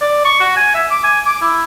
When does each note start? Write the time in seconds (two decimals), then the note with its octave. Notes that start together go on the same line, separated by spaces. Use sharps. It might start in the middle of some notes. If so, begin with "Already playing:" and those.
0.01 D5
0.25 C#6
0.40 F#4
0.57 G#5
0.75 E5
0.90 D6
1.04 G#5
1.26 D6
1.42 E4